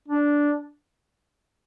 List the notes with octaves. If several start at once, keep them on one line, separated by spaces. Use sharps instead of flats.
D4